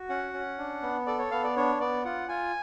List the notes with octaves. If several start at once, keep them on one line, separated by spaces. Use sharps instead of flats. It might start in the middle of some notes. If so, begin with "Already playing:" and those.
Already playing: F#4
C#4 F#5
C#4
D4
B3
A4 D5
C#5
B3 F5
D5
D4 C#5
B3 D5
F4 F#5
F4 G#5